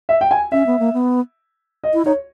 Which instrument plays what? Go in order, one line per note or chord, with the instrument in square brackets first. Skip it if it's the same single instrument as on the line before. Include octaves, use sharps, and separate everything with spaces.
[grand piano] E5
G5
G#5
[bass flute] C#4 [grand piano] E5
[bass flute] B3
A#3
B3
[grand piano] D#5
[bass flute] E4
[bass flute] D#4 [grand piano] C#5